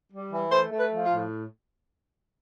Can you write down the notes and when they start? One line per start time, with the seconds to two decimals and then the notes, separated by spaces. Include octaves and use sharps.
0.11 G3
0.32 E3
0.52 A3 C5
0.71 A3
0.79 B4
0.91 F3
1.05 F4
1.12 A2